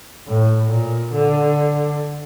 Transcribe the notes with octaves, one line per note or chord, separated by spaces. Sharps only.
A2
A#2
D3